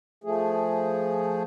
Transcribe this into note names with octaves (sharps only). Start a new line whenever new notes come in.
F3 A3 G#4